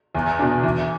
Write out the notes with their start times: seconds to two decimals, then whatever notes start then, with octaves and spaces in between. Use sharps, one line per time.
0.15 E2
0.39 B2 B3 D4
0.63 E3